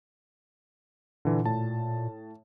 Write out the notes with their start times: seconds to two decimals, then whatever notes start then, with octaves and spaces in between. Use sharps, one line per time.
1.25 A#2 D3 E3
1.45 A2 A5